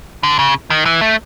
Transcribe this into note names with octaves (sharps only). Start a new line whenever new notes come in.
D3
C#3
D#3
E3
A3